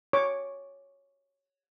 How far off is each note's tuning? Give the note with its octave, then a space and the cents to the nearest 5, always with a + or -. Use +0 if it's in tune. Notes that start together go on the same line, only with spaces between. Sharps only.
C#5 +0 D6 +0